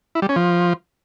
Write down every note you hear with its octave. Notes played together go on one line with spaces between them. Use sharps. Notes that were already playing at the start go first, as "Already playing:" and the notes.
E4
G3
C#4
F3